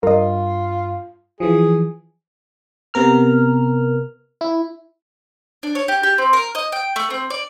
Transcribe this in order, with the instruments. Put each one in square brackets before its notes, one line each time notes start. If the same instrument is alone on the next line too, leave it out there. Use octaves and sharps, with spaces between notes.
[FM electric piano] G2 [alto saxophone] F4 [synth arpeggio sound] A#4 D#5
[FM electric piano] E3 F3 [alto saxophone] G#4
[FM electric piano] C3 B3 A#4 F6
E4
[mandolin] D4
C#5
G4
G4
C4
A#4
D#5
G5
A3
C4
D5